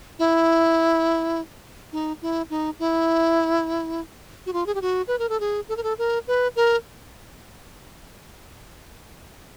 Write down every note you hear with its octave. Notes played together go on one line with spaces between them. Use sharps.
E4
D#4
E4
D#4
E4
F#4
F4
G#4
G4
F#4
B4
A#4
A4
G#4
A4
A#4
A4
A#4
B4
A#4